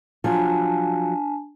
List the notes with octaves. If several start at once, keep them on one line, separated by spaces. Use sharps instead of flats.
F3 F#3 D4 F4 G#5 A5